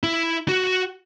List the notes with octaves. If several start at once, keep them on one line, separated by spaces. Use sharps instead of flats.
E4
F#4